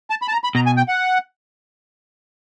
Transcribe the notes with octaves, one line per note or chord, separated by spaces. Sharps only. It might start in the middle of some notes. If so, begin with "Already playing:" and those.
A5
B5
A5
A#5
B5
B2 A#5
G#5
G5
F#5